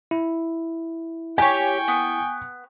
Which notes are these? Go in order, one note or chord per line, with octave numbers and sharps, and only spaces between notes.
E4
G4 C#5 G5 G#5 C#6
B3